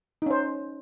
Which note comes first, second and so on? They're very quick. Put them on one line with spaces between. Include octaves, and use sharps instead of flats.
D#4 C#4 C5